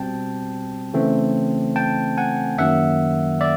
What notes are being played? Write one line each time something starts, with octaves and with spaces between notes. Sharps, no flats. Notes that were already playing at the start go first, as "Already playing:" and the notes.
Already playing: B2 G3 C4 G5 A5
C#3 E3 A3 C4
G5 A5
F#5 G#5
F#2 D#3 F#3 A#3 E5 F#5
D5 E5